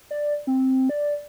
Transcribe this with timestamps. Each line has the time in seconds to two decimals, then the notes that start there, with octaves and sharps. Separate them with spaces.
0.11 D5
0.47 C4
0.89 D5